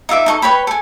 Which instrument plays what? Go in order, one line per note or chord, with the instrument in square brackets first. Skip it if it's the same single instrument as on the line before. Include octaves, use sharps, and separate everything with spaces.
[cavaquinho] D#4 F4 E5 D6
D#4 A4 C#6
B4 C#5 G5 B5
A4 G#5